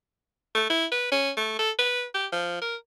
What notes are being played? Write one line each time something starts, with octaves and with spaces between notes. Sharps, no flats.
A3
E4
B4
C#4
A3
A4
B4
G4
F3
A#4